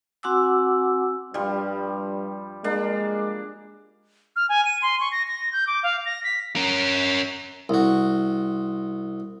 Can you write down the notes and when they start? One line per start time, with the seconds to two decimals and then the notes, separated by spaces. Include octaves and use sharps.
0.23 C4 F#4 F#5 G#5 D6 E6
1.34 G2 F3 G3
2.64 G#3 A#3 D4
4.36 F6
4.49 G#5
4.65 D#7
4.82 C6
5.00 C#6
5.12 A#6
5.27 A#6
5.53 G6
5.67 D6
5.83 F5
6.05 A#6
6.24 B6
6.56 C#4 A#4
7.69 C2 F#4